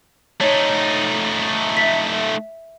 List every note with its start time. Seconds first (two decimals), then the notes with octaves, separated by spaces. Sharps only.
0.41 A3 D#4 C#5
1.77 E5 B6